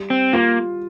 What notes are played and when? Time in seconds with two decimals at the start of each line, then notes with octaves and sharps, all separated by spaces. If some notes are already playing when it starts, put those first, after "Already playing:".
Already playing: G3
0.10 C4
0.33 A#3 F4